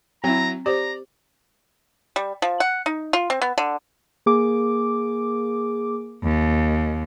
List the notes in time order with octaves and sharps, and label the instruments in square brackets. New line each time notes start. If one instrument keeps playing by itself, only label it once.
[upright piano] F#3 E4 [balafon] C4 [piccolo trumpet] A#5
[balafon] G4 C5 [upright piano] D5 [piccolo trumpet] A#5
[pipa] G3
F3
F#5
D#4
F4
C4
B3
D3
[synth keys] A#3 G#4 D6
[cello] D#2